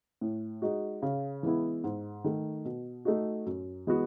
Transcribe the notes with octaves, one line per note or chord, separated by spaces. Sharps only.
A2
G#3 D#4 F#4
C#3
E3 G#3 B3 E4
G#2
D#3 A3
B2
A3 D#4 F#4
F#2
E3 G#3 B3 F#4